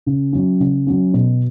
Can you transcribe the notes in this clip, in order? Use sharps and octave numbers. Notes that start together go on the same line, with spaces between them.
C#3
F#3 C#4
C#3
F#3 C#4
B2